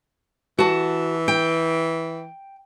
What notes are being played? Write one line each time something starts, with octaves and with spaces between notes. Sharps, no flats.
E3 F#4 A5
G5